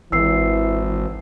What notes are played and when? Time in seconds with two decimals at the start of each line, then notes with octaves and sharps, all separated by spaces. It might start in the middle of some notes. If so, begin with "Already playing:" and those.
0.12 G#1 E3 E6 C7